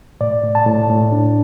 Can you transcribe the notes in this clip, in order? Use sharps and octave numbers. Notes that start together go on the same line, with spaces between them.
A2 D5
A2
A5
A2
A2
D4